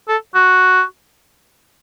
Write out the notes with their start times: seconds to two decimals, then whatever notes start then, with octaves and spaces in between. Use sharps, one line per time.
0.08 A4
0.35 F#4